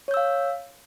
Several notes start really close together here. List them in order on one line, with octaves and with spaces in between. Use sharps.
C#5 G6 E6 F5